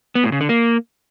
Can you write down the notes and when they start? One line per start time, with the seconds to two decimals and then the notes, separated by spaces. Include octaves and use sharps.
0.15 B3
0.24 A2
0.32 C#3
0.41 D3
0.49 A#3